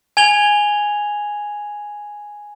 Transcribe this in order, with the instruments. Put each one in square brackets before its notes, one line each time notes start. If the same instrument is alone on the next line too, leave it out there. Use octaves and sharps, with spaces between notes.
[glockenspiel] G#5 G#6 F7 G7